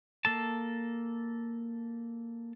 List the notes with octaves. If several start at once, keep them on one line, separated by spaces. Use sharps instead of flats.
A#3 A4 A5